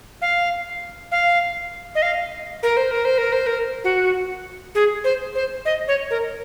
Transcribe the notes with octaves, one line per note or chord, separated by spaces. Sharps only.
F5
F5
D#5
F5
A#4
C5
A#4
C5
A#4
C5
A#4
F#4
G#4
C5
C5
D#5
C#5
A#4